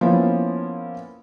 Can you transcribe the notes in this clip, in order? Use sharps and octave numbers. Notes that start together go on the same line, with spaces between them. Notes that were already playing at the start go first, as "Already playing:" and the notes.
F3 A#3 B3 C#4 E4